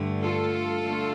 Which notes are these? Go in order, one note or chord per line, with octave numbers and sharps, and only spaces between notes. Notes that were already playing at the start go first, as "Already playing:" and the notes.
Already playing: G2 D3 A3
F4 A4
D3 A3